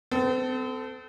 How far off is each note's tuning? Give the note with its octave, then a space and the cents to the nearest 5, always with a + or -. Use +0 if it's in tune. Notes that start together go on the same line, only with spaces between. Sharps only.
C4 -40 A4 +0